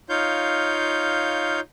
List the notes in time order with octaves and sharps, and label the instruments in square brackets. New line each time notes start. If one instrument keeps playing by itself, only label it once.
[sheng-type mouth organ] D#4 F4 C#5 F5 G6